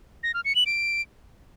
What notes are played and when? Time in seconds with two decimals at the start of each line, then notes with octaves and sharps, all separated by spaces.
0.23 A#6
0.34 F6
0.45 C#7
0.55 F#7
0.66 D7